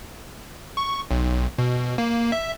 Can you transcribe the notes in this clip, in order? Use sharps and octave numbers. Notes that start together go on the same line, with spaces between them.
C#6
B1
B2
A#3
E5